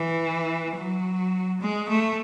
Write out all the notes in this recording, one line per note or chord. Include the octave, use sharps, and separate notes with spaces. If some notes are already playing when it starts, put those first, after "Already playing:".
Already playing: E3
F#3
G#3
A3